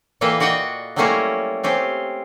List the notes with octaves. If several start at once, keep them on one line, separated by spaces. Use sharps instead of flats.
A#2 E3 A#3 A4 B4 G5
F#4 D5 D#5 F#5 G5
F#3 G3 A3 A#3 C#4 E4
C4 C#4 G4